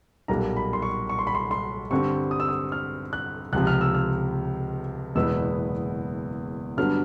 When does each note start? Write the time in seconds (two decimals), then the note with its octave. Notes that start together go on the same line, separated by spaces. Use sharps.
0.28 B1 A#2 G3 A#3 A#5
0.57 B5
0.73 C6
0.82 C#6
1.09 C#6
1.19 C6
1.27 B5
1.35 C6
1.51 C6
1.91 G2 D3 G3 C4 C#6
2.31 D#6
2.40 E6
2.48 D#6
2.72 F6
3.13 F#6
3.53 C#2 C3 F3 F#6
3.67 F6
3.81 E6
3.94 F6
5.15 F#1 E2 B2 G#3 B3 E6
6.77 G2 D3 F#3 B3 D4 F6